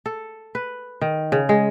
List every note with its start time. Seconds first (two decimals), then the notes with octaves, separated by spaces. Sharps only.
0.06 A4
0.55 B4
1.01 D#3
1.32 C#3
1.49 G#3